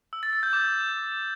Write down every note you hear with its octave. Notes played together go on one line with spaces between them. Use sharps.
E6
A6
A6
G6
D6